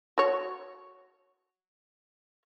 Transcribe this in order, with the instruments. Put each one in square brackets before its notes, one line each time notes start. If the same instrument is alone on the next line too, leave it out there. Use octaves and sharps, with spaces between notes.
[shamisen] F#4 C#5